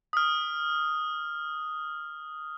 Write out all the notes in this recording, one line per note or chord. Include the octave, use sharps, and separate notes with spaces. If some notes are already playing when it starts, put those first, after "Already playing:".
D#6 F6